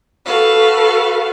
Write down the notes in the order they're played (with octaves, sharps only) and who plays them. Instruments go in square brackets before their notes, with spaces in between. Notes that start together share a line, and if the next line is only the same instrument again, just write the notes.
[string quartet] F#4 A4 B4 F5